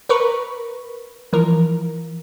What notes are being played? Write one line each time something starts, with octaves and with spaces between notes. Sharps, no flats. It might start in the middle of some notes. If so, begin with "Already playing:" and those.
A#4 B4 C#6
E3 F3 A#4